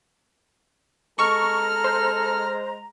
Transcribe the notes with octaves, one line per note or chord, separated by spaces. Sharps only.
G#3 A4 A#5 C#6 F6
C5